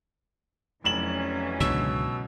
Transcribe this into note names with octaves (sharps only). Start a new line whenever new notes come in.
F1 E3 F#3 C#4 E7 F#7
C#2 G#2 B2 D3 E6